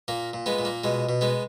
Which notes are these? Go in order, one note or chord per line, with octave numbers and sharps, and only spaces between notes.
A#2 A#3
A#2
G#3 B3
A#2
A#3
B2 G#3
B2
G#3 B3